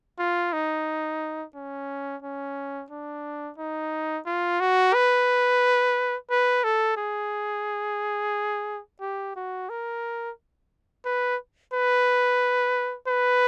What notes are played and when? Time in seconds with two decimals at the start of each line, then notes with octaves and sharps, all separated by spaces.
0.19 F4
0.53 D#4
1.55 C#4
2.22 C#4
2.90 D4
3.58 D#4
4.26 F4
4.60 F#4
4.94 B4
6.30 B4
6.64 A4
6.97 G#4
9.01 G4
9.36 F#4
9.70 A#4
11.06 B4
11.74 B4
13.08 B4